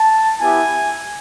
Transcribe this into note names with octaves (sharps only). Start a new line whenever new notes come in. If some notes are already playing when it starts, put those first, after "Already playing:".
Already playing: A5
B3 E4 G4 G#5